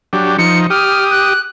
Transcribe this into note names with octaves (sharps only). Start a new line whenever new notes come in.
F#3 D4 G4
F3 D#4 C#7
G4 D#6 F6
F#6